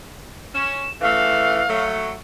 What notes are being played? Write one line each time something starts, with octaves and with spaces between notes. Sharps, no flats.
C#4 E7
C#3 E3 A3 F5
F#3 A3